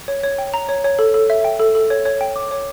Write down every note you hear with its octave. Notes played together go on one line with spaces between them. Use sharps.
C#5
C#5
G5
A#5
C#5
C#5
A4
A4
E5
G5
A4
A4
C#5
C#5
G5
D6
C#5